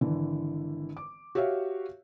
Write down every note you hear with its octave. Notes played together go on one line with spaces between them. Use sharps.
G#1 D3 E3
D6
F#4 G4 C#5 E5 F5